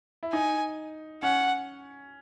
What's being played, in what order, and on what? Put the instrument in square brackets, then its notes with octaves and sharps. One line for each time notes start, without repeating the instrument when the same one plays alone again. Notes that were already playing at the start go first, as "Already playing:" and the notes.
[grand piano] E4
[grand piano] D#4 [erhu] G#5
[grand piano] C#4 [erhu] F#5